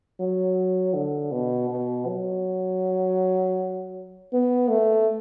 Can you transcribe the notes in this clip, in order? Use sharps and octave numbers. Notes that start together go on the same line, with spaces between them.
F#3
D3
B2
B2
F#3
B3
A3